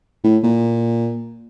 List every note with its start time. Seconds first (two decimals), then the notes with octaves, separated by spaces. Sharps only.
0.24 A2
0.44 A#2